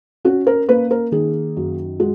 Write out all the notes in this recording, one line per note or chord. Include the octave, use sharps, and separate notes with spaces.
C#4 F#4
A#4
A#3 B4
A#4
D#3 G#4
F#2
G#3 F#4